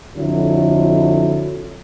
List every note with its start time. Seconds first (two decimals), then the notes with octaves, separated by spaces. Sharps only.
0.18 F2 D3 F#3 E4